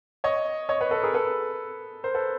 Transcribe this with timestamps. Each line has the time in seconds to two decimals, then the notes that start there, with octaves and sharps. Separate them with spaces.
0.24 C#5 D#5
0.69 C#5 D#5
0.81 B4 C#5
0.91 A4 B4
1.03 G#4 A#4
1.14 A4 B4
2.04 A#4 C5
2.14 A4 B4